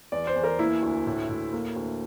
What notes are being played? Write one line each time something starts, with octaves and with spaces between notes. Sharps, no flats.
E2 D5
C5
E2
A#4
A#3 E4
D2
A2
A2
A#3
D2